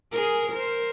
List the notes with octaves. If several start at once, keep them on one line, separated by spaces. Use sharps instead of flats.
G#4 A#4
A#4 C5